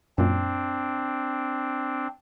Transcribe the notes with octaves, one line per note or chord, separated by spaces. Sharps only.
F#2 A#2 C4 D4